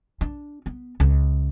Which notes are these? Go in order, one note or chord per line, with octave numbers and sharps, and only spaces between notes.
D4
B3
C#2